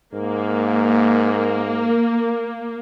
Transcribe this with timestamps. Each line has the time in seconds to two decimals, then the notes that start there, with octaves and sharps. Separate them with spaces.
0.14 G#2 A#3